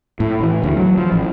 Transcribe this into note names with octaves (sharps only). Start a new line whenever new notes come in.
A2
E3
D2
F#3
F3
A1